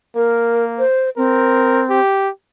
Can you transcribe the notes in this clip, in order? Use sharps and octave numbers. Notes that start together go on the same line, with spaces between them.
A#3 A#4
C5
C4 A#4
G4